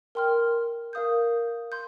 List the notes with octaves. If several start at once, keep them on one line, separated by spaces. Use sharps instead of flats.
A#4 G5 C6 F6
A#4 F5 D#6 G6
C6 G6